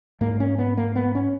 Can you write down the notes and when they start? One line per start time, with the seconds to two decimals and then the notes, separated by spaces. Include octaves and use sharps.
0.21 G#2 A#3
0.40 C#4
0.58 B3
0.77 A#3
0.96 B3
1.15 C#4